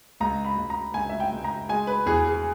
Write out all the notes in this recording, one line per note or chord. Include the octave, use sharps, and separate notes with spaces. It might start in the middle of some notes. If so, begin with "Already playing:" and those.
C#2 A#5
B5
C#2
A#5
C#2 G#5
E5
G5
C#2
A#5
G#3 G#5
B4
E2 G#4
G#4